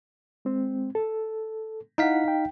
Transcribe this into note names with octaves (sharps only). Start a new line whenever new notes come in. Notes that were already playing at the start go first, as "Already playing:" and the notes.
G#3 C4
A4
D#4 E4 F5 F#5 B6
G5